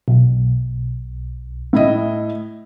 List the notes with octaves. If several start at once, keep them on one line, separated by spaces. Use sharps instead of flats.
B1
A2 E4 D#5